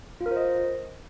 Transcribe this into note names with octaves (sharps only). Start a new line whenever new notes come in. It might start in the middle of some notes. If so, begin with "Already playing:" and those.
F4
A#4
C5
D#5